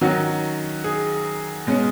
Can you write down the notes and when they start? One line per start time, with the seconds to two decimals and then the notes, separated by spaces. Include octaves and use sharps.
0.01 D#3 F#3 C#4 F#4
0.84 G#4
1.67 B2 G#3 C#4